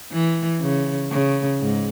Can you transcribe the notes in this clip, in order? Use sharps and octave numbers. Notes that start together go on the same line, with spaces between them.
E3
C#3
C#3
G#2